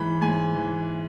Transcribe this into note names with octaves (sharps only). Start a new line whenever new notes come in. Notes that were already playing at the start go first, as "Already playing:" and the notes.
Already playing: G#2 E3 B5
G#2 G#5
E3